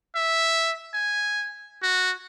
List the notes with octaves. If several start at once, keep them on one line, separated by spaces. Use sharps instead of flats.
E5
G#5
F#4